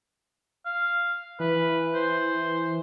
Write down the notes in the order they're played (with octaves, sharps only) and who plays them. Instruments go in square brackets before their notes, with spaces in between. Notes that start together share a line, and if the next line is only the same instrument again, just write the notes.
[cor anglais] F5
[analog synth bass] E3 [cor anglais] B4
[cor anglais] C5